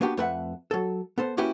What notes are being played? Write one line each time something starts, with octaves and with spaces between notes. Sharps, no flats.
A#3 B3 D4 F#4 G4
F2 A3 B4 E5 F#5
F#3 A4
B3 A4 C5
A#3 C#4 E4 F#4 G4 B4